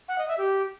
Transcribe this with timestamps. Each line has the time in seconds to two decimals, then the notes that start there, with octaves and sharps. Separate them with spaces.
0.08 F#5
0.18 D#5
0.28 E5
0.38 G4